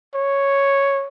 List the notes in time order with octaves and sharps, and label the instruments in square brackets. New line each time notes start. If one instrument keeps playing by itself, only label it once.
[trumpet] C#5